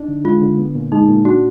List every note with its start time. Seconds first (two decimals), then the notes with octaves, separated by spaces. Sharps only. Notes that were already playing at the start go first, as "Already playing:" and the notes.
Already playing: D4 D#4
0.08 D3
0.24 G#3 F4
0.42 D3
0.59 B3
0.75 A#2
0.92 G#3 D#4
1.09 A#2
1.25 D4 F#4